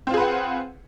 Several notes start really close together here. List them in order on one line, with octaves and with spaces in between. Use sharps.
C4 F4 G#4 B4 F#5